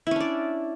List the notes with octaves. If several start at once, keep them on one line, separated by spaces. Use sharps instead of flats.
C#4 D4 E4 D5